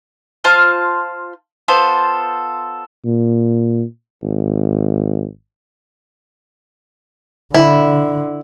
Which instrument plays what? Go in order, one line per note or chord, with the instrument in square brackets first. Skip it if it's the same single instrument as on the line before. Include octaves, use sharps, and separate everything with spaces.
[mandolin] F4 C5 F5 A5
B3 F4 A4 C5
[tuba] A#2
G#1
[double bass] D3 [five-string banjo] E4